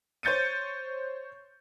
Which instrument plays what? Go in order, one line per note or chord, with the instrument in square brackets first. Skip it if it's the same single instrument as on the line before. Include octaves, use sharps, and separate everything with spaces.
[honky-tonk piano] C5 C#5 G6 A6 C#7 D#7